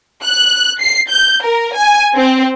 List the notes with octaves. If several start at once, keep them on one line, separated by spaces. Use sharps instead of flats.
F#6
C7
G6
A#4
G#5
C4